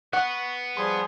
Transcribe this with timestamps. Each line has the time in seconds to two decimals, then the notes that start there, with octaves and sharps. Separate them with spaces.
0.13 B3 F#5 C#6 F#6
0.77 F3 G3 G#4 C6